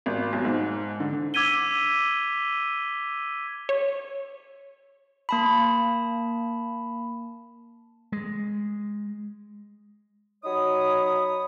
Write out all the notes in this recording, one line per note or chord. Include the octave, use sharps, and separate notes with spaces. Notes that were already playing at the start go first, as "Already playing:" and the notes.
G#1
B1
G#2
D3
D6 E6 G#6 B6 D#7 G7
C#5
A#3 A5 B5
G#3
F#3 D#4 C#5 B5 D#6